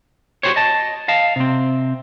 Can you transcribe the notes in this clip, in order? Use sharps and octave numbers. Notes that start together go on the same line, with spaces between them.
F#4 G4 C5 C#5
D#5 A5
D#5 F5 A5
C3 C4